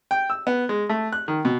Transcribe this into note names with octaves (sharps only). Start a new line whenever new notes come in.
G5
E6
B3
G#3
A3
F#6
D#3
B2